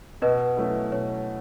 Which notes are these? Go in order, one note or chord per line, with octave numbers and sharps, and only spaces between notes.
B2 B4 D#5
F#3 A3 C#4 E4
B2 C#5